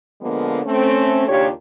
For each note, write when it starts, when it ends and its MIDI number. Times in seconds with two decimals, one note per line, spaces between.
0.22 0.60 50
0.22 0.60 53
0.22 0.60 56
0.22 0.60 58
0.22 0.60 59
0.65 1.25 57
0.65 1.25 60
0.65 1.25 61
1.28 1.48 39
1.28 1.48 49
1.28 1.48 62
1.28 1.48 65
1.28 1.48 67
1.28 1.48 73